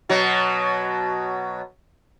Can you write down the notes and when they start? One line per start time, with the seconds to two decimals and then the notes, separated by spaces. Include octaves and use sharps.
0.09 B2 F#3